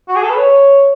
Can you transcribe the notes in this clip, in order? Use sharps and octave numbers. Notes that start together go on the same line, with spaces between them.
F#4
G#4
A4
B4
C#5